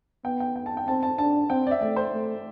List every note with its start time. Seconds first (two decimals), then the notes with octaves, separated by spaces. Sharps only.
0.25 B3 G5
0.40 G5
0.56 G5
0.66 A5
0.77 G5
0.87 C4 A5
1.03 A5
1.18 D4 A5
1.50 C4 G5
1.67 D5
1.71 E5
1.81 A3 D5
1.96 C5
2.13 A3